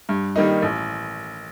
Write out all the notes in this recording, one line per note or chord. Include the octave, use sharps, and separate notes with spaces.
G2
D#3 G3 A#3 D#4
A1